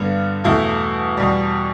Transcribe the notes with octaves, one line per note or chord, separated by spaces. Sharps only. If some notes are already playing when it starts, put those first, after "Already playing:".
Already playing: G2 D3 B3
E2 B2 A3 E4
E2 B2 G3